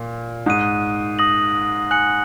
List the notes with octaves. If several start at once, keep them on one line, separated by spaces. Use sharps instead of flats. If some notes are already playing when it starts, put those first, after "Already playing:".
Already playing: A#2
G#2 D#6 F#6 D#7
D#6 A#6 F#7
G#5 F#6 C#7 F#7